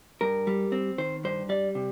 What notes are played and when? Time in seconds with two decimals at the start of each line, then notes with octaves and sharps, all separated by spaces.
0.21 G2 A#4
0.47 G3
0.72 C4
0.98 D#3 C5
1.24 G2 C5
1.49 G3 D5
1.75 C3